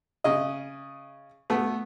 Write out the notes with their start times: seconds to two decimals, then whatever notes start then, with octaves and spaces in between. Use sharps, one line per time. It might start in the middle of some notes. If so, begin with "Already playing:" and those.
0.24 C#3 D#5
1.50 A3 B3